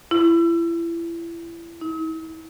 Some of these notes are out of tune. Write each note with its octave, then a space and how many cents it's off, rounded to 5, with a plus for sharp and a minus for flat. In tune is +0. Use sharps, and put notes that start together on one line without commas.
E4 +30
E4 -40